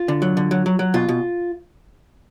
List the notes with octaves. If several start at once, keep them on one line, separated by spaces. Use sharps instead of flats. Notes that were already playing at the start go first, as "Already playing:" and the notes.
Already playing: F4
D3
F#3
D3
F#3
F#3
F#3
B2 F4
B2